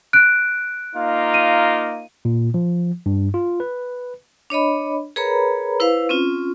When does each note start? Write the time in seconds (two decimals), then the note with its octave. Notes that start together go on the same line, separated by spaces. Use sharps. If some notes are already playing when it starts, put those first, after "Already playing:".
0.13 F#6 D7
0.95 A#3 D#4 F4
1.34 D#7
2.25 A#2
2.54 F3
3.06 G2
3.34 F4
3.60 B4
4.50 D4 C#5 D#5 B5
5.16 G#4 A#4 B4 C#5 A#5 B5
5.80 E4 B4 C5 F5
6.09 C4 C#4 F4